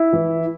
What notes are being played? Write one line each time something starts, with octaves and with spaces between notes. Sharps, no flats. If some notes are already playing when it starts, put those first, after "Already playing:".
Already playing: E4
E3